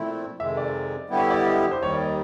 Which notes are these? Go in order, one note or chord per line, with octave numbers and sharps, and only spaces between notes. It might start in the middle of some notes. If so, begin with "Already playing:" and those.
Already playing: A#2 F3 A3 C4 E4
F2 C3 D#3 G#3 E5
D5
D3 G3 B3 E4 G4
C#5
D5
D#5
C5
D#2 D#3 G3 C#5
D5
D#5